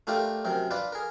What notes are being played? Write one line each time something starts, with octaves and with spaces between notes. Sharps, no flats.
A3 D4 F4 G4 A#4
F#2 C3 A#4
D4 F4 B4 D5
G#4 A#4